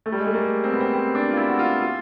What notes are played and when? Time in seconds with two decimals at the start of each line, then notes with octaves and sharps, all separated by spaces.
0.06 A3
0.12 G3
0.20 G#3
0.27 A3
0.34 A#3
0.64 C4
0.72 B3
0.80 C4
0.94 C4
1.15 D4
1.31 F4
1.37 E4
1.49 F#4
1.59 F4
1.81 F4